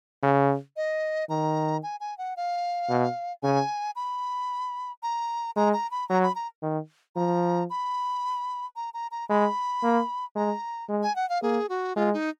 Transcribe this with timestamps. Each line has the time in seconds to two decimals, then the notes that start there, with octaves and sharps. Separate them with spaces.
0.23 C#3
0.76 D#5
1.29 D#3 A#5
1.83 G#5
2.00 G#5
2.18 F#5
2.37 F5
2.89 B2
3.43 C#3 G#5
3.96 B5
5.03 A#5
5.56 G#3 A#5
5.73 A#5
5.91 B5
6.09 F#3 A#5
6.23 B5
6.35 A#5
6.63 D#3
7.16 F3 A#5
7.70 B5
8.76 A#5
8.94 A#5
9.11 A#5
9.29 G#3 B5
9.83 A#3
10.35 G#3 A#5
10.89 G#3
11.03 G#5
11.16 F#5
11.29 F5
11.42 A#3 G#4
11.69 F#4
11.96 G#3 F4
12.13 D#4